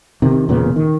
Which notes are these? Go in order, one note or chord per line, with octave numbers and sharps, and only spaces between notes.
C3 D#3
E1 A#2 C#3 B3
D#3